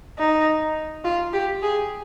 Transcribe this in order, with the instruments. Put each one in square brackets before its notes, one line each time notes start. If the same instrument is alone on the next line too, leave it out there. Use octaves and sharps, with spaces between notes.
[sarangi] D#4
F4
G4
G#4